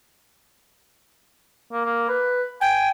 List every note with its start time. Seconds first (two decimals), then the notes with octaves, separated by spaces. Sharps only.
1.72 A#3
1.85 A#3
2.09 B4
2.61 G5 G#5